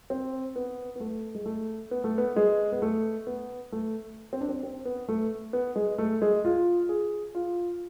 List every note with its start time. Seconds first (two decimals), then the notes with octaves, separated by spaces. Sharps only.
0.10 C4
0.56 B3
0.96 B3
1.00 A3
1.35 G#3
1.46 A3
1.91 B3
2.04 A3
2.18 B3
2.36 G#3
2.72 B3
2.82 A3
3.27 B3
3.72 A3
4.33 C4
4.41 D4
4.49 C4
4.63 C4
4.85 B3
5.08 A3
5.53 B3
5.76 G#3
5.98 A3
6.22 G#3
6.45 F4
6.89 G#4
7.35 F4